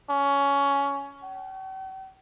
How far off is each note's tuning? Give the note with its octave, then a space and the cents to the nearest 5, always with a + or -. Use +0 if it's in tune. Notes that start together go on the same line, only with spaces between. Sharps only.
C#4 +15
G5 -45